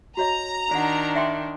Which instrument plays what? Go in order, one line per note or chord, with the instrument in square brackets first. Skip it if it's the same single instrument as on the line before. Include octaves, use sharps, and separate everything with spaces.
[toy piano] F#4 C#5 D#5 [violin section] A#5
[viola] D#3 D4 [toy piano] D5 F#5
[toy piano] E5 G5 C6